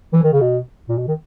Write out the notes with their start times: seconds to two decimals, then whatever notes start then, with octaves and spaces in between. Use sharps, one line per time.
0.13 E3
0.23 D#3
0.33 C#3
0.41 B2
0.89 A#2
0.98 B2
1.08 D#3